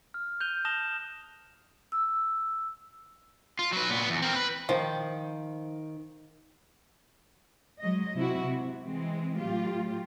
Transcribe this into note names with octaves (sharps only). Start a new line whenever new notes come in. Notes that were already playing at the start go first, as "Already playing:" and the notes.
F6
F#6 G6 D#7 F7 G7
A5 D#6 A#6 E7 F7 G7
E6
F4
F#3 B4
A#2 B3
E2
C4 A#4
B4
D#3 F3
F#3 G#3 D#5
C3 E4 F#4
C3
E3 G#3 C4
A2 F#3 F4 G4